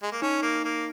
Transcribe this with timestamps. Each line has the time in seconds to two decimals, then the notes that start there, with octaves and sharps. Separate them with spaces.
0.03 G#3
0.12 A#3
0.22 C#4 D#4
0.42 A#3
0.64 A#3